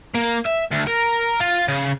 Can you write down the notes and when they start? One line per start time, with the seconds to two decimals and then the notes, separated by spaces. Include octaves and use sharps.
0.14 A#3
0.45 E5
0.71 D2
0.87 A#4
1.40 F4
1.68 C#3